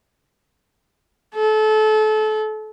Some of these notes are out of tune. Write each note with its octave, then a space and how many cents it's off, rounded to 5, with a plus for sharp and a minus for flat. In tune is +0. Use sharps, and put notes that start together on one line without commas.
A4 -30